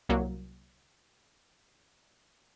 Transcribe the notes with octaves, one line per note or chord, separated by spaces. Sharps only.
C2 F#3 A#3